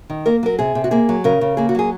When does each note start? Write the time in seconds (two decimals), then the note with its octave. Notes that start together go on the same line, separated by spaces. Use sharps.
0.10 D#3
0.26 A#3 A#4
0.43 F#3 A#4
0.59 C3 G#4
0.75 C3
0.84 F#4
0.91 A#3 G#4
1.09 F#3
1.24 C#3 A#4
1.41 C#3
1.57 A#3 G#4
1.69 F#4
1.75 F#3 G#4